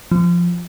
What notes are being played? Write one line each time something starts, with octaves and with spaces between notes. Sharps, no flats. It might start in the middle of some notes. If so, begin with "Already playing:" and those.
F3